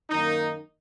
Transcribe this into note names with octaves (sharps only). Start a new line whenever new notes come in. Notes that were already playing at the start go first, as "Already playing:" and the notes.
F#2 D#3 A#3 D#4